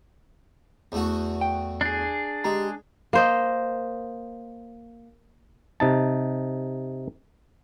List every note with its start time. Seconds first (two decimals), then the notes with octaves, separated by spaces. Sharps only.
0.92 E2 A3 F#4
1.41 G5
1.81 D4 G#4
2.44 G#3 G4 A#5
3.13 A#3 C5 D#5
5.80 C3 D#4 A5